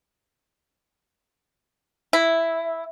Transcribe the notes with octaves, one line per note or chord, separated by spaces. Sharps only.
E4